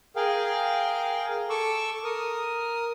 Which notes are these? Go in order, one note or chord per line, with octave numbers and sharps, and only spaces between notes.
G#4 A#4 F5 G5
A4 C#6 D6 E6
A#4 D#6